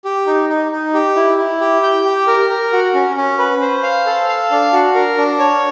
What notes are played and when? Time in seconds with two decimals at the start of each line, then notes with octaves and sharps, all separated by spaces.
0.05 G4
0.27 D#4
0.49 D#4
0.72 D#4
0.94 G4
1.16 E4
1.38 E4
1.61 G4
1.83 G5
2.05 G4
2.27 A#4
2.50 A#4
2.73 F#4
2.94 C#4
3.17 C#4
3.38 B4
3.61 C5
3.83 F5
4.06 A4
4.29 F5
4.51 D4
4.73 F#4
4.95 A#4
5.17 D4
5.39 C#5